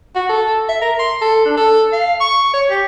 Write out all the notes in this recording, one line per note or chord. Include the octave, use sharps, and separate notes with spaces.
F#4
A4
E5
A#4
C6
A4
D4
A4
F5
C#6
C#5
G4